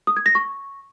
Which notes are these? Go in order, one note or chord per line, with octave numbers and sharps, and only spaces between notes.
D#6
G#6
A#6
C#6